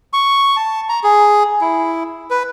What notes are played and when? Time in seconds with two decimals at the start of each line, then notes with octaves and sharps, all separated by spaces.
0.13 C#6
0.57 A5
0.89 A#5
1.03 G#4
1.61 E4
2.30 B4